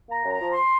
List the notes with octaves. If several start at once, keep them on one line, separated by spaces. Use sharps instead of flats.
A#3 A#5
F#2
A#5
F3
C6